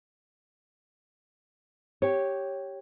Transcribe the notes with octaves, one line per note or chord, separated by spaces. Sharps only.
G4 C#5